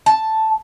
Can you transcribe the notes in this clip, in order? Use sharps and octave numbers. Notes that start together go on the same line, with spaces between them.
A5